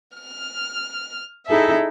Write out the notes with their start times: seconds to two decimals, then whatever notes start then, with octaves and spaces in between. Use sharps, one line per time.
0.16 F6
1.48 D#4 E4 G#4 A4 E5